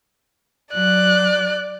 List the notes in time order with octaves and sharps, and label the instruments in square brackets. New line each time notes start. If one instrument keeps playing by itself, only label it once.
[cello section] F#3 [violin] D5 [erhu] F#6